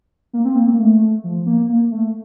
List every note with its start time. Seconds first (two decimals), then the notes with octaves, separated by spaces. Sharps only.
0.33 A#3
0.45 C4
0.56 A#3
0.67 A#3
0.79 A3
1.24 F3
1.46 A#3
1.69 A#3
1.91 A3